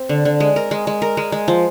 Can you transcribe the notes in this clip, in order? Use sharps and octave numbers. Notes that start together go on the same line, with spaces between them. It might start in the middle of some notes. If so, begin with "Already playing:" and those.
Already playing: C4
D3
D3
G#3
A#4
G#3
G#3
A#4
G#3
G#3
F3